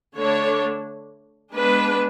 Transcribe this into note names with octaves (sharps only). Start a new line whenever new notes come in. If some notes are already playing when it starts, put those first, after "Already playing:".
D3 A3 D4 C#5
G#3 B3 D4 B4